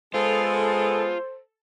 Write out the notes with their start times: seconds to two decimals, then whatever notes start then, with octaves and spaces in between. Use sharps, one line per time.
0.14 G#3 B3 F4 G#4 A4 C5